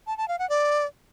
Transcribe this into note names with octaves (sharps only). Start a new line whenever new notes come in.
A5
A5
F5
F#5
D5